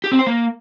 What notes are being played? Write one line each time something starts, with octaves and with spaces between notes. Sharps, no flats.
G4
C4
C5
A#3